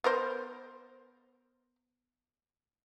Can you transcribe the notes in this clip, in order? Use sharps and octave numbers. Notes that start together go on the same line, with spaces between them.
B3 A#4 C5